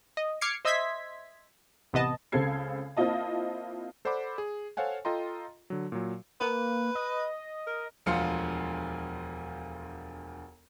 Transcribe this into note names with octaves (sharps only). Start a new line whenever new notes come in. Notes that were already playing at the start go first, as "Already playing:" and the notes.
D#5
D6 F6 G#6 C7 C#7
C5 D#5 E5 C6 G#6 B6
A1 C3 B3 D#5 A5
C#2 C#3 C4 A4 G#6 C7
A#3 C4 E4 F4 D#5 A5
A4 C5 D5 F#5 B5 D6
G#4
A4 C5 C#5 F5 F#5 G#5
F4 A4 D#5 G5 A#5 C6
D3 F#3
A#2 F#3
A#3 B4
D#5
A#4
E1 D2 F3 F5 C6 C#7